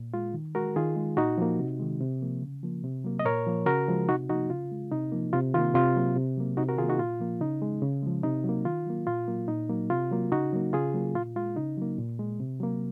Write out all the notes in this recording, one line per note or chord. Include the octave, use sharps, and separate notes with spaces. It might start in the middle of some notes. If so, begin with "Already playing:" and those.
Already playing: A#2
G#3 F4
D#3
G#3 F#4 A#4
D#3 F4 G#4
G#3
A#2 D#4 F#4
F3 A#3
C3
D#3 G#3
C3
F3 A#3
C#3
F3 A#3
C3
F#3 A#3
D#5
A#2 A#4 C#5
F3 A#3
C#3 F#4 A#4
F3 G#3
C3 D#4 F#4
F3 A#3 D#4 F#4
C#3 F4
G#3
C3 D#4
F3 A#3
C3 F4
D#3 A#3 F4
C3 F4
F#3 A#3
C3
F#3 A#3
C3 D#4 F#4
F#4 A#4
D#3 F4 G#4
A#3
D#4 F#4
A#2 F4
F3 A#3
C#3 D#4
G#3
C#3
F3 G#3
C3 D#4
F#3 A#3
D#3 F4
F#3 A#3
A#2 F4
F#3 A#3
A#2 D#4
F#3 A#3
C3 F4
F#3 A#3
C#3 D#4 F#4
F#3 A#3
C#3 F4 G#4
F#3 A#3
A#2 F4
G#3 F4
C#3 D#4
F#3 A#3
A#2
G#3
C3
F#3 A#3